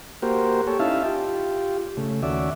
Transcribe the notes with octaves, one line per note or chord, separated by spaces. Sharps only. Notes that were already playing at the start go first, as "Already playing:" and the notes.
A#3 F#4 G4 A#4 C5
G4 A4 C#5
C#4 D#4 E4 E5 F5 A5
F4 G4
C#3 A3
D#2 C#4 F#4 D5 E5